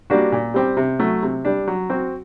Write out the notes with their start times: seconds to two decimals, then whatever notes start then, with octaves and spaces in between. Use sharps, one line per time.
0.10 G3 A#3 D4 F#4
0.32 A#2
0.54 G3 C4 G4
0.77 C3
1.00 F#3 A3
1.23 C3
1.45 G3 D4
1.68 F#3
1.90 C4 F#4